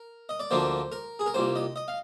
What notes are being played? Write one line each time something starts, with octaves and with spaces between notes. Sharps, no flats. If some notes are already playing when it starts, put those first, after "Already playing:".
Already playing: A#4
D#5
D5
D2 D3 F3 A#3 D4 C5
A#4
G#4
A#4
C2 A#2 G3 C5
D#5
D#5
F5